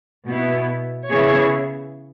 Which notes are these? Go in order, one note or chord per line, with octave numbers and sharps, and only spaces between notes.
B2 B3 E4
C#3 E3 B3 E4 G#4 C#5